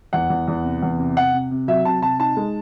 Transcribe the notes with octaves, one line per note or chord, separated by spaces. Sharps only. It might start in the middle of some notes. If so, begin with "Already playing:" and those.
E2 F#5
E2
E2
C3
E2
C3
C3 F#5
C3
C3
F#3 E5
C3 A5
C3 A5
D#4 A5
G#3